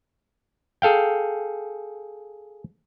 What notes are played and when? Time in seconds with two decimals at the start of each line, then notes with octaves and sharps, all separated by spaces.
0.82 G#4 A4 F5 G5